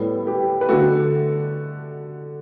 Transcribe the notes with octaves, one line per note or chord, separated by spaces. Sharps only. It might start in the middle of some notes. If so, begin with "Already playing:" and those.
Already playing: A2 G3 B3 A4 C#5
G4 B4
B4
D3 A3 F#4 A4